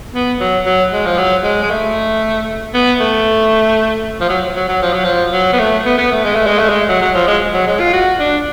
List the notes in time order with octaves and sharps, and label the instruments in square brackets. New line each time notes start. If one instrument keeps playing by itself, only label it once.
[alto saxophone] B3
F#3
F#3
G#3
F3
F#3
G#3
G#3
A3
B3
A3
F3
F#3
F#3
F#3
F3
F#3
F3
F#3
B3
A3
B3
B3
A3
G#3
A3
G#3
A3
G#3
F#3
F#3
F3
G#3
F#3
G#3
F4
F#4
D4